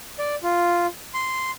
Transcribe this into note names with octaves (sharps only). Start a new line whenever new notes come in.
D5
F4
C6